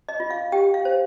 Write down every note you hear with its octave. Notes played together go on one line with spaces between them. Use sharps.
D#5
F4
F5
G4 G5
F5
C5